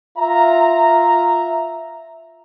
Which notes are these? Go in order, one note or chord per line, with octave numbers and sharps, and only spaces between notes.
F4 E5 A#5